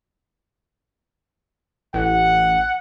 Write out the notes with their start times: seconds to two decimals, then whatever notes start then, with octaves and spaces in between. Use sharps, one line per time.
1.94 A1 F#5